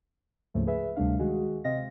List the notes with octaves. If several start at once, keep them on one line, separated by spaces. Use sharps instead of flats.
D2 G#2 C#3 F3 A3 A#3
G#4 B4 E5
D2 C3 G3 A3 D4 F5
D#3 G#3 F#4 G#4
C3 C4 D#5 F5 A#6